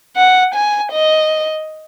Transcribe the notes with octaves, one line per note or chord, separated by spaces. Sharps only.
F#5
G#5
D#5